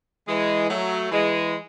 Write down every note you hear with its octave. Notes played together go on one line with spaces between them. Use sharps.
E3 G#3
F#3 A3
E3 G#3